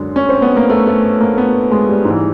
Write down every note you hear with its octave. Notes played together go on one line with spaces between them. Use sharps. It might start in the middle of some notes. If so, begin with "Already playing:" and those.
Already playing: F#2 D3 G#3
C#4
C4
B3
A#3
A3
A3
A#3
B3
G#3
G3
G#2 E3